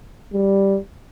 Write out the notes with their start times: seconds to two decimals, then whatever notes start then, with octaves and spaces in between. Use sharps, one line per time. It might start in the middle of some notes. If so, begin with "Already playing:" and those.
0.34 G3